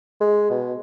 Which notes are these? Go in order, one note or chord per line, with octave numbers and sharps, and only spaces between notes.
G#3
B2